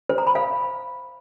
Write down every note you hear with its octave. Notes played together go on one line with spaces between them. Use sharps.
C5
A#5
B5
F5